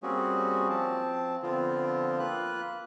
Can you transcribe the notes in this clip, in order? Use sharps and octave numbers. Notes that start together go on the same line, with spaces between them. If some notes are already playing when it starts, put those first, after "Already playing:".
G3 A#3 C4 C#4 F#4 G#4
F3 C4 A5
D3 F3 B3 C4 F4
A#3 F4 B4 F#6